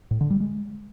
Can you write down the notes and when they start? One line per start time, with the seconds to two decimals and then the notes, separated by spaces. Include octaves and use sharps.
0.11 A2
0.21 D3
0.30 G3
0.40 G#3